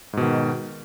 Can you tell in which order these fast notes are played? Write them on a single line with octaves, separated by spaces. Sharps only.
G#2 B2 D#3